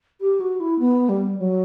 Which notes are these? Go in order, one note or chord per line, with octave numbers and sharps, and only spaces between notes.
G4
F#4
E4
B3
G3
F#3